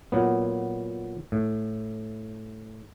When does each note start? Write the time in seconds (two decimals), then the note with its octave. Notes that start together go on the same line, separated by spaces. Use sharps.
0.12 A#2 F#3 B3
1.32 A2